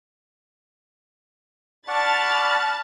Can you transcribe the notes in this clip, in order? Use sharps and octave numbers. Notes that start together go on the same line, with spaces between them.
D5 F#5 A5 B5 C#6 F6 A6